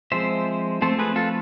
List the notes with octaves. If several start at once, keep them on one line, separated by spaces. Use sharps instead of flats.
F3 G#3 C4 C5 E5
F3 A3 C4 A4 C5
G#4 B4
F4 A4